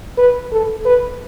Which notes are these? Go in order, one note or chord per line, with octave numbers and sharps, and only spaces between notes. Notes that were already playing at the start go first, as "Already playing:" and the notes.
B4
A4
B4